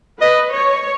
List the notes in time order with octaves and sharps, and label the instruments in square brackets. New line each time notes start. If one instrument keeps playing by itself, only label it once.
[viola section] B4 [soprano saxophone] D#5
[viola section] C#5